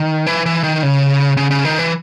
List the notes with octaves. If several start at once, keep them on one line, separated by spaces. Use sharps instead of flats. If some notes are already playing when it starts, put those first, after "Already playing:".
Already playing: D#3
E3
E3
D#3
C#3
C#3
C#3
D#3
E3